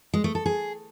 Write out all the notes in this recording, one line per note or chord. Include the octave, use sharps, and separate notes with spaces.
G#3
A3
A4
G#4